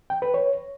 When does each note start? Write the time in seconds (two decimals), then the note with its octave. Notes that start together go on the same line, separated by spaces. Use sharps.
0.10 G5
0.22 B4
0.34 C#5